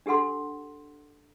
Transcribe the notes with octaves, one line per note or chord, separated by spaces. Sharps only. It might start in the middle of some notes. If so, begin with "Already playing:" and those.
D4 G4 A4 F#5 C6